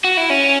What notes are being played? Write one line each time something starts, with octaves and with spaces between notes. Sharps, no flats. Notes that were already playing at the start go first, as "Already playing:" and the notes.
F#4
E4
C#4